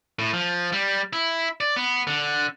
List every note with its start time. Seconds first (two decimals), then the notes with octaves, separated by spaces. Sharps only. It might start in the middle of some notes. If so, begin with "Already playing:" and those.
0.19 A2
0.33 F3
0.72 G3
1.13 E4
1.60 D5
1.77 B3
2.07 D3